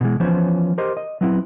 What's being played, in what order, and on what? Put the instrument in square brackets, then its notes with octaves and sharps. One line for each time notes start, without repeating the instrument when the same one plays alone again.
[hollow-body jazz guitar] B2 E3 G#3
E3 F3 B3 C#4 C5 C#5
G4 A#4 C5 D#5
D#5
F#3 B3 C4 E4